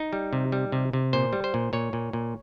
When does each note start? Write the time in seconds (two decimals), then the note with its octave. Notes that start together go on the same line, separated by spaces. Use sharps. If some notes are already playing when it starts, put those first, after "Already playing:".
Already playing: D#4
0.13 G3
0.33 C3
0.52 G3
0.72 C3
0.93 C3
1.13 A#2 C5
1.33 G3
1.44 C5
1.54 A#2
1.73 A#2 C#5
1.93 A#2
2.13 A#2